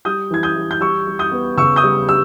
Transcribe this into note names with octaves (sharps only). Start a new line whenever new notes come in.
G3 D#6 G6
E3 G#6
D#6 G6
G3
G6
G3 C#6 E6
G3
D#6 G6
B3
C#3 C#6 E6
D#6 G6
G3
G3 E6